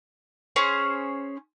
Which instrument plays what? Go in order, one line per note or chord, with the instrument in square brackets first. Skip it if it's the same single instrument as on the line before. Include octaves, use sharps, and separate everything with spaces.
[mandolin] C#4 G#4 C5 C#5